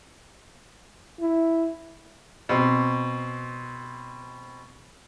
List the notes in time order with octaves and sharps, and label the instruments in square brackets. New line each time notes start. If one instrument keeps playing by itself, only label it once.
[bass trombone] E4
[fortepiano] B2 C4